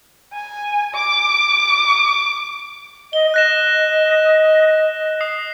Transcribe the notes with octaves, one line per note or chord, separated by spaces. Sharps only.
G#5
D6
D#5 G7
D#5 F#6 A#6 E7
D#6 C7